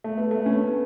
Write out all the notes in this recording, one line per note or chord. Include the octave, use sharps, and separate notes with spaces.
A3
B3
A3
C#4
B3